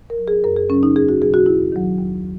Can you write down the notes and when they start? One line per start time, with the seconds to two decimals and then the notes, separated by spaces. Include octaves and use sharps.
0.10 A#4
0.18 F#3
0.28 G#4
0.44 F#2 A#4
0.56 G#4
0.70 C#3 F#3 C#4
0.83 D#4
0.96 E2 G#4
1.09 F#4
1.21 B2 F#3 G#4
1.34 F#4
1.46 D#2 E4
1.72 D#3 F#3
1.99 D#2